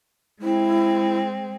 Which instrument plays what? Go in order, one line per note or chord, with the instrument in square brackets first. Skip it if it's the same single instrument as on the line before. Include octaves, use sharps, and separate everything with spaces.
[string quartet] G#3 C4 [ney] E4